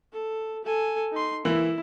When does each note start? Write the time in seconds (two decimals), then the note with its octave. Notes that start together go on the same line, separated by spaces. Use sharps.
0.12 A4
0.65 A4 G#5
1.12 D#4 C6
1.45 E3 A#3 E4